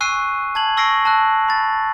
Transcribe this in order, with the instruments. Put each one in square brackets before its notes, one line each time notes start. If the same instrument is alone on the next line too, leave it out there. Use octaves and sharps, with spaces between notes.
[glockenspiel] G#5 C#6 E6 F#6 C7 D#7
A5 G#6 F#7
C#6 E6 A#6 C7 D7
A5 E6 F#6
B5 A6